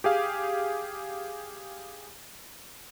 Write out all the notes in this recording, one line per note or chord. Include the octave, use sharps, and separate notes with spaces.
G4 G#4 F5